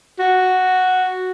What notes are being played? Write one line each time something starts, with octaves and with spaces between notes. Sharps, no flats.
F#4